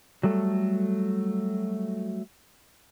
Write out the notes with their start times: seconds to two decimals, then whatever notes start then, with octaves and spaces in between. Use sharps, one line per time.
0.23 F#3 G3 A3 A4